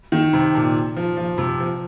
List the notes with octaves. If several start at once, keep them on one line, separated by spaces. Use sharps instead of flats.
D#3
C3
A#2
F3
F3
C3
F3